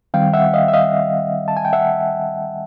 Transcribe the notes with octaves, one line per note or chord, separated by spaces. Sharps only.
D#3 G3 C4 F5 G5
E5 F#5
D#5 F5
E5
D#5 F5
A5
G#5
G5
E5 F#5